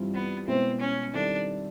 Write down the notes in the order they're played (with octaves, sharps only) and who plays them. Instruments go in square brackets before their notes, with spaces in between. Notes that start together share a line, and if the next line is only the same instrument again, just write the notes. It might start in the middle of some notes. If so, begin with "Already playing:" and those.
Already playing: [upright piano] G2 E3 G3 C4 F4
[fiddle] B3
[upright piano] B2 G#3 B3 E4 [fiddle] C4
[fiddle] C#4
[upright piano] D#3 G3 C4 E4 A4 [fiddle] D4